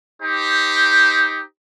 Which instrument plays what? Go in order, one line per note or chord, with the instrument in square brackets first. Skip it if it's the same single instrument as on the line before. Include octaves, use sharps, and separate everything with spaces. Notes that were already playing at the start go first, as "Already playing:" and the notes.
[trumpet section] D#4 G4 C5